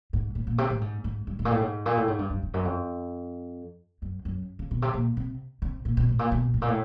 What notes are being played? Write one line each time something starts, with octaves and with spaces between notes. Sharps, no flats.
G#2
A2
A#2
C3
A2
G#2
G#2
G2
G#2
A#2
A2
G#2
A#2
A2
G#2
G2
F#2
F2
F#2
F2
F#2
F#2
C#3
B2
C3
A#2
C3
C3
A#2
B2
A2
A#2
B2
A2
A#2
A2